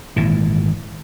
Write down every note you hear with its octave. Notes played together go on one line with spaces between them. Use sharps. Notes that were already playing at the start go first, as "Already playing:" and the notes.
G#1 A#2 E3